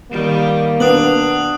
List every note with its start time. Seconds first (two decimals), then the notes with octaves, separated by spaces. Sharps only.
0.11 D#3 G3 A#3
0.80 B3 D4 D#6 F#6 F#7